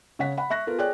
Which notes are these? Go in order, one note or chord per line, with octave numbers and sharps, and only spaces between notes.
C#3 C#5 F#5 B6
F#5 B5
E5 C#6 F#6 A#6
B3 F4 A4 A#4
G#4 C#5 D5 G5 F#6